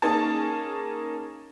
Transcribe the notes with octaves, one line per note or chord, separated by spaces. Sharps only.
A#3 C#4 D#4 G#4 A5